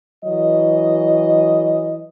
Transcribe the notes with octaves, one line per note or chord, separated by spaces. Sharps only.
E3 F#3 D#5